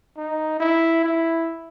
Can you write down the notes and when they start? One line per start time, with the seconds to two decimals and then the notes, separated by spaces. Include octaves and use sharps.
0.18 D#4
0.60 E4
1.05 E4